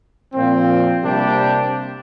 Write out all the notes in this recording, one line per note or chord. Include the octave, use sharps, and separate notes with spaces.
A#2 F3 C4
C3 G3 A#3 D4 G4